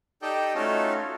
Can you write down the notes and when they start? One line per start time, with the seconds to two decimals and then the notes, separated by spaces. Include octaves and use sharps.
0.22 D#4 G4 A4 D5 D#5 G5
0.55 A3 C#4 D#4 F4 F#4 A4